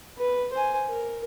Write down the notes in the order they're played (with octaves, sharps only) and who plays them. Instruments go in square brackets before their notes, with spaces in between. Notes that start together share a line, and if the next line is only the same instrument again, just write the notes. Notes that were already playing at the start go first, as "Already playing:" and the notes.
[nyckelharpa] B4
C5 G#5
A#4